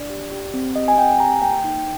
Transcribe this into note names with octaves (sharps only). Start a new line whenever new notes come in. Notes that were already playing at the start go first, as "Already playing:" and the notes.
Already playing: D4 D5
G4
G4
C4
G4 D#5
G#5
C4 G5
G#5
G4 A#5
A#3 G5
D#4